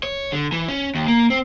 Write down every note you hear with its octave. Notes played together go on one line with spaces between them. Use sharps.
C#5
D3
E3
C#4
D#2
A#3
C4